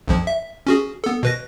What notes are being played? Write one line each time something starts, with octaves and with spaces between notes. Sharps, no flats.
B1 F2 F3
E5
C#4 F#4 G#4
B3 A4
B2 B4 A#6